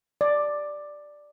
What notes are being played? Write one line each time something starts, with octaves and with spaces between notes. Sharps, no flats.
D5